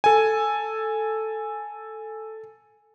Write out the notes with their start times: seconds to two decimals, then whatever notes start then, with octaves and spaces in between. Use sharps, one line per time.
0.04 A4 G#5